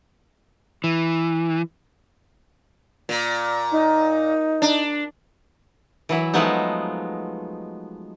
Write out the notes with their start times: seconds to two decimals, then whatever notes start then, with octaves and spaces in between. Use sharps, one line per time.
0.84 E3
3.09 A#2
3.72 D#4
4.62 D4
6.09 E3 F#3 E4
6.33 F3 F#3 G#3 A3 B3 D#4